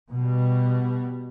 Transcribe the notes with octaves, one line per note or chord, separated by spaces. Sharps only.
B2 G3